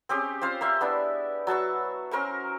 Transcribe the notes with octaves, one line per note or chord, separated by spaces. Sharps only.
C4 C#4 G4 G#4
C4 F4 C5 F5
A#3 C5 E5
B3 D4 E4
F#3 A5 C#6 E6
C#4 A#4 C5 C#6